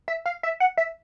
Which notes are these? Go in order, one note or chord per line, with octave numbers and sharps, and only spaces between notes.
E5
F5
E5
F#5
E5